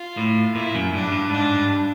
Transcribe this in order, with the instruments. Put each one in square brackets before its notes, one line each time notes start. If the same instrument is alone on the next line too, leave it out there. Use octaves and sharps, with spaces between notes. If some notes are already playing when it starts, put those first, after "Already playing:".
Already playing: [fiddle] F4
[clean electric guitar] A2
[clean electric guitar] A#2 [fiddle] E4
[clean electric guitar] F#2
[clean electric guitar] G2 [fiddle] D4
[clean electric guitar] G2
[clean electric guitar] G#2 [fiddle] D4
[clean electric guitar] G2